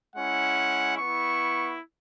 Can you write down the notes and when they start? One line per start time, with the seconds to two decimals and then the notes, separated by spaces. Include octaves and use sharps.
0.15 G#3 C#4 E4 F#5
0.97 B3 E4 C#6